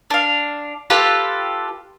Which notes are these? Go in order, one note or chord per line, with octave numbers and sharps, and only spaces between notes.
D4 F5
F4 G4 A4 B4